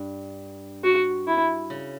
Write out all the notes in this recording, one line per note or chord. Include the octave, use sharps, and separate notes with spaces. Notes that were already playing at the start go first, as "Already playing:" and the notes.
Already playing: G2 G3
F#4
E4
C#3